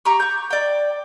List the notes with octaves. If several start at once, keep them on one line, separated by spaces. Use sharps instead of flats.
G4 A#5 C#6
C#6 G6
D5 G5